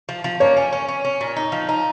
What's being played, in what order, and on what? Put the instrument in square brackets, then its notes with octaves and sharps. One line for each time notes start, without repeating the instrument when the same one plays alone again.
[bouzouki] F3
F3
[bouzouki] A#3 [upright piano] C#5
[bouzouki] C#4
C#4
C#4
C#4
A#2
D#4
F3
D#4